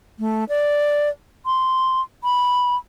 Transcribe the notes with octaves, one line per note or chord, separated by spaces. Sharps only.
A3
D5
C6
B5